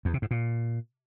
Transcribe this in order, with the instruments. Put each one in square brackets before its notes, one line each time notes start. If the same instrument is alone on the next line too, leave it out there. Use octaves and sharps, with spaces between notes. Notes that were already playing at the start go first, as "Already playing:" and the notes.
[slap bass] E2
C3
G#2
A#2